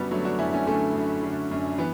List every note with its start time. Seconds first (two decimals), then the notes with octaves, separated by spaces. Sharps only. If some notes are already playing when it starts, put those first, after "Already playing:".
Already playing: F#2 D3 G3 B3 D4 F#4
0.11 D3 F#3 A3
0.25 D4 F#4
0.39 F#2 C#4 E4
0.53 A3 C#4
0.67 D3 A3 C#4
0.95 F#2
1.23 D3
1.51 F#2
1.78 E3 B3